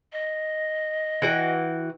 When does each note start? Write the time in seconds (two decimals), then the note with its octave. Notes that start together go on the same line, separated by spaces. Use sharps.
0.13 D#5
1.22 E3 F#4 G5